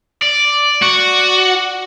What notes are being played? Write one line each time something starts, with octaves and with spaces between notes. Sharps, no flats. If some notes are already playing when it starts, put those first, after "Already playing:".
D5
F#4